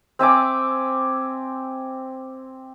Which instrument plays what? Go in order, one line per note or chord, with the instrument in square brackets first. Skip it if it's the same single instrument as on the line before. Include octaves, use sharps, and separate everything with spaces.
[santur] C4 E5 G#5 D6